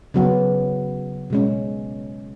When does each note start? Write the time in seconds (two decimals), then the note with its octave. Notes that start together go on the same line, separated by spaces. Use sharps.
0.14 C#3 F#3 B3
1.30 B2 G#3 C#4